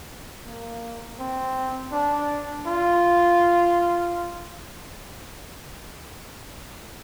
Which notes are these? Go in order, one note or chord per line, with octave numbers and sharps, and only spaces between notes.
A#3
C4
D4
F4